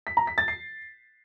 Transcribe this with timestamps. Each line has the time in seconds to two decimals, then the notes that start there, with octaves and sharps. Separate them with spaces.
0.07 B6
0.17 A#5
0.27 B6
0.38 A6
0.48 C7